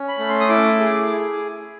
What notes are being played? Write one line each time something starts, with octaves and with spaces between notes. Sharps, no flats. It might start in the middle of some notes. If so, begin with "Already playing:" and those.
Already playing: C#4
B5
A3
C6
D#6
E4 D6
G#4